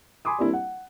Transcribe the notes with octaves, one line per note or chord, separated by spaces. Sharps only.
G#5 B5 C6 D6 D#6
G3 A#3 C4 D4 E4
F#5